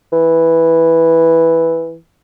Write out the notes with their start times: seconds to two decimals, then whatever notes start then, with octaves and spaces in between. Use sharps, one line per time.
0.12 E3